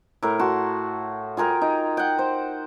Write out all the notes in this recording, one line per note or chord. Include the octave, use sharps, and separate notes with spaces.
A2 A#4
F#4 A5 C6
F4 G#4 A#4 G5
D#4
F#5 G5
C5